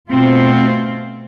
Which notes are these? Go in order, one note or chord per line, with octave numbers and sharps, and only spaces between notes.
B2 A3 C4 F4